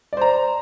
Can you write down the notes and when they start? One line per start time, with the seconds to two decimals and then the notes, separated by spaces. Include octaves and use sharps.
0.13 D5
0.17 C5
0.22 A#5